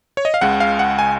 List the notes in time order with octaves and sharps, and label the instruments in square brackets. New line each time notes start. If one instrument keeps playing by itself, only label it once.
[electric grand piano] C#5
D#5
F5
C#2 C#3 G#3 F#5
F5
F#5
G#5